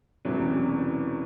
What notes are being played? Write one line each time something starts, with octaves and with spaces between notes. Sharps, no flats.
E1 E2 C3 F#3 C#4